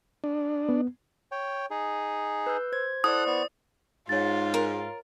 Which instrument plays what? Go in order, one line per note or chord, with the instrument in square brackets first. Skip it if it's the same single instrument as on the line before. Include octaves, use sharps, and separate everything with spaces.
[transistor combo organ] D4
[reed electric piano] B3
[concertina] C#5 G5
D#4 G#4
[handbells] B4 E6 G6
C5 G#6
[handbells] E4 C5 D5 [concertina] A4 F#5 F#6 [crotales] D#6
[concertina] B3 C#6 [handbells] D5
[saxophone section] G#2 [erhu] F4 [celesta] C#5 A6
[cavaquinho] A#4